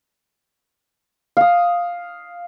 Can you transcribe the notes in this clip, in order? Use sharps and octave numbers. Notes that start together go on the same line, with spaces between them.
F5 D#6